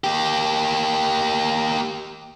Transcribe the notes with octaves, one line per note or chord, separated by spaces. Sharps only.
A#3 G4